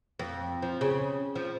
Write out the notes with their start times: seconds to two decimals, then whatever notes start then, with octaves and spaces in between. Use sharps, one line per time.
0.19 F2
0.62 F3
0.81 C#3
1.35 F3